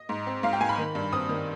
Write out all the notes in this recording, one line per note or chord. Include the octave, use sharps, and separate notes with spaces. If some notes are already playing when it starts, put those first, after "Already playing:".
Already playing: D#5
G#2
C4
G#2 F5
G5
G#2 G#5
B5
D#3
G2
C4 D#6
D#3